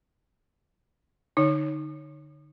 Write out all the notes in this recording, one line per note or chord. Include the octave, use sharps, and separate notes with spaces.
D3 D#4 C#5